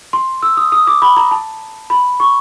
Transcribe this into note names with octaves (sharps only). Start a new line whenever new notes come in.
C6
E6
D#6
D#6
D6
B5
A#5
A5
B5
C#6